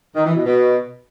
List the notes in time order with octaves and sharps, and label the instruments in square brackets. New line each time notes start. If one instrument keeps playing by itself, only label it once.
[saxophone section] D#3
E3
B2
B2